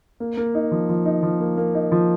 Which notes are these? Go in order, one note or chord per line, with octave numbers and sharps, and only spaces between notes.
A#3
A#3
D#4
F3
F3
D#4
F3
A#3
A#3
D#4
F3